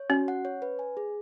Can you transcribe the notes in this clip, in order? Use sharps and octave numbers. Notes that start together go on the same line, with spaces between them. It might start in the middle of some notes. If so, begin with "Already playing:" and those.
Already playing: C#5
C#4 F#4
F#5
C#5
B4
G#5
G#4